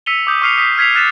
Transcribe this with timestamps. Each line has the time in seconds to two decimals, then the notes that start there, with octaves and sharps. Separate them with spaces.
0.06 E6 B6 C#7 D#7 F7 G7
0.27 D6 D#6 G6
0.42 C#6 D6 F6 C7 C#7 F7
0.57 D#6 B6 C7
0.78 F6 G#6 B6 C7 F7
0.95 F6 F#6 A6 B6 C#7 E7